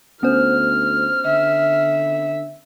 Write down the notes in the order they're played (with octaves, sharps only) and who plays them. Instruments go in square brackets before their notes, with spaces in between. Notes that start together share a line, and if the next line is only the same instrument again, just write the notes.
[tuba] D2 [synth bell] B3 C#4 C5 [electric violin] F6
[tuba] D3 [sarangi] E5